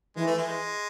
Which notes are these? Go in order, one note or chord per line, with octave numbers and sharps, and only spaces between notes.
E3 G#3
A3
G#3